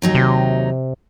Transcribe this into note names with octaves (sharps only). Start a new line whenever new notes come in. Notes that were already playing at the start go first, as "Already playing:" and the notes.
D#2 F#3 D#4
C3